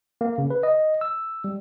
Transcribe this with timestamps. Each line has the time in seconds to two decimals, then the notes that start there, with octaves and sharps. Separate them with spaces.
0.21 A#3
0.38 C#3
0.50 B4
0.63 D#5
1.01 E6
1.44 G3